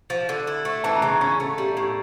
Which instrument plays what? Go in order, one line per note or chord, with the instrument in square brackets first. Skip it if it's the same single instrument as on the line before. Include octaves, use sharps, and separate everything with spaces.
[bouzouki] F3
D3
E4
A3
[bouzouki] E3 [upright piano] A5
[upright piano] A#5
[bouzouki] C#3
[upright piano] C#6
[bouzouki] C#4 [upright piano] C#6
[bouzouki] A3
G3
A2